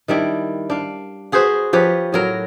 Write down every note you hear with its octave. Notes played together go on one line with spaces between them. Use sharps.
D#3 G3 D4 E4
D4 F5
F#4 G#4 B4 C5
F3 G4 B4 C#5
A2 F#3 A#4